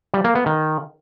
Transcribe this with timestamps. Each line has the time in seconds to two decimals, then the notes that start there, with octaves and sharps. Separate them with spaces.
0.14 G3
0.24 A#3
0.35 B3
0.46 D#3